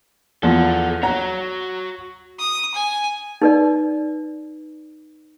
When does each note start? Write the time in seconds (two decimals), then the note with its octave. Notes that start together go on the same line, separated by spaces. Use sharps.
0.43 E2 F3 A4 F#5
1.03 F#4 C#5 F#5 A#5
2.39 D#6
2.74 G#5
3.42 D#4 B4 D5